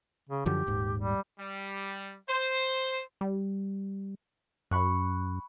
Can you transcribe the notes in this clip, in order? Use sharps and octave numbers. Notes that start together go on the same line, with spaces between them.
C#3
F#2 D3 F3 G4
D#1 G#2
G3
G3
C5
G3
F#2 B5 C#6 F#6